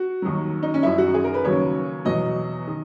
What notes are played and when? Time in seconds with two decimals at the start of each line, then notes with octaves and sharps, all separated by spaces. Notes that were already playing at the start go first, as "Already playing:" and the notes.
Already playing: F#4
0.22 D#2 D#3 F#3
0.63 D#4
0.74 C#4
0.83 F#2 D#3 F#3 E4
0.98 F#4
1.14 G#4
1.24 A#4
1.34 B4
1.44 D#2 C#3 F#3 C#5
2.05 E2 B2 F#3 D#5
2.67 D#3